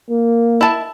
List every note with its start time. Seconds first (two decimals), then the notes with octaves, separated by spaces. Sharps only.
0.11 A#3
0.61 E4 A5